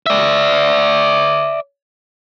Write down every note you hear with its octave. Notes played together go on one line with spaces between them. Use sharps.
D5 E5